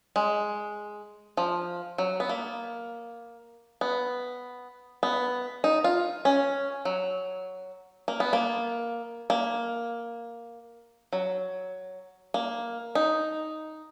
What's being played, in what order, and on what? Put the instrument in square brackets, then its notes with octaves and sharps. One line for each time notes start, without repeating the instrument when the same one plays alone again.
[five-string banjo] G#3
F3
F#3
B3
A#3
B3
B3
D#4
F4
C#4
F#3
A#3
B3
A#3
A#3
F#3
A#3
D#4